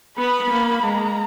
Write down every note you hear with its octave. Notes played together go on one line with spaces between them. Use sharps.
B3 B5
A#3
G#3 A#5